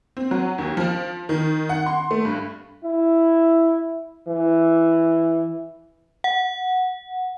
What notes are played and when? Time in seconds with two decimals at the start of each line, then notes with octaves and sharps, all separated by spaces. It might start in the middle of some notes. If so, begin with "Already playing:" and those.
0.17 C4
0.31 F#3
0.58 D#2
0.77 F3
1.29 D#3
1.69 F#5
1.86 C6
2.11 A3
2.25 G2
2.84 E4
4.28 E3
6.24 F#5